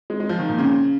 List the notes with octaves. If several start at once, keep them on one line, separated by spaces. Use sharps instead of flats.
G#3
G#3
F3
D#3
A#2
C#3